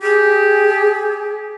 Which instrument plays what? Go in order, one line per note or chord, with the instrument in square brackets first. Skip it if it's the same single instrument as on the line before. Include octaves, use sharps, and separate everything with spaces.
[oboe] G4 [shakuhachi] G#4